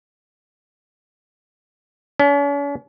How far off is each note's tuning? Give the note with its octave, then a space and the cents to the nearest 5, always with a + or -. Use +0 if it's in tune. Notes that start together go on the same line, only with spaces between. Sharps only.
C#4 +45